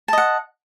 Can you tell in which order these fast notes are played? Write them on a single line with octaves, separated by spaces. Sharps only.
A5 D#5 F#5